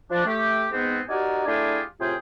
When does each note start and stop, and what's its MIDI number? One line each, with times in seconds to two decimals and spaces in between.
0.10 0.24 53
0.10 0.24 62
0.26 0.66 57
0.26 0.66 67
0.71 0.99 44
0.71 0.99 59
0.71 0.99 60
1.09 1.46 63
1.09 1.46 66
1.09 1.46 67
1.09 1.46 70
1.09 1.46 74
1.09 1.46 80
1.46 1.80 57
1.46 1.80 62
1.46 1.80 64
1.46 1.80 65
1.46 1.80 67
1.46 1.80 68
1.99 2.15 45
1.99 2.15 48
1.99 2.15 65
1.99 2.15 68
1.99 2.15 79